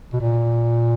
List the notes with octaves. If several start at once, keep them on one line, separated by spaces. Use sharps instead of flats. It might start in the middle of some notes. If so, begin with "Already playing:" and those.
B2
A#2